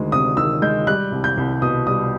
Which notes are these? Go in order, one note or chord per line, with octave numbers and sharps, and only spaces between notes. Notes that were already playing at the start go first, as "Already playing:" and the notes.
Already playing: D2 D#3 G#3
C3 D#6
D#3 E6
G#3 G6
G3 F#6
C2
G6
C2
B2 D#6
G3 D#6